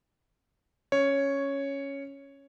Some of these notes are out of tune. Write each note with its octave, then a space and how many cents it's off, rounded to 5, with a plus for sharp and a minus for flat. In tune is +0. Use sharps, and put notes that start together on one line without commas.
C#4 +0 C#5 +0